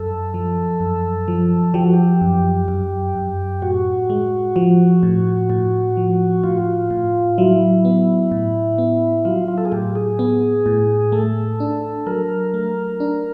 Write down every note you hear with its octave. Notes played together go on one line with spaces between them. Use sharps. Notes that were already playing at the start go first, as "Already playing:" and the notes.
Already playing: F#2 A4
F3
F#2
F3
F3 G4
F#4
G4
F#2
F#2
F#2
A2 F#4
G#3
F3
A2
A2
F3
A2 F4
A2
F#3 E4
B3
A2
B3
F#3 F4
F4
A4
G#4
A2 G4
G#4
B3
A2
A3 A4
D4
F#3 A#4
A3
D4